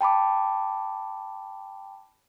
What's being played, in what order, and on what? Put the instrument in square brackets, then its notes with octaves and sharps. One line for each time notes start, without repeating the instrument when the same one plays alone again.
[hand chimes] G5 A5 B5 D6